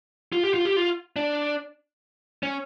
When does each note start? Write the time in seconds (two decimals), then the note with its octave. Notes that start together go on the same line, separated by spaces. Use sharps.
0.32 F4
0.44 G4
0.54 F4
0.65 G4
0.76 F4
1.16 D4
2.43 C#4